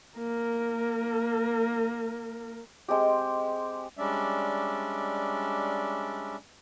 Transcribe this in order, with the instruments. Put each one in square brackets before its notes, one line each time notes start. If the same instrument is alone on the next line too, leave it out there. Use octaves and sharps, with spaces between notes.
[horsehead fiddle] A#3 A#4
[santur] G#3 C4 G4
[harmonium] G3 G#3 C#4 D4 D5 E5